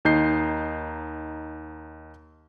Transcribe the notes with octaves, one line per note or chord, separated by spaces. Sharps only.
D#2 D#4 G6 C7